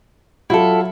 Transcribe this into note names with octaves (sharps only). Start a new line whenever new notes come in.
F#3 E4 F4 A4 F5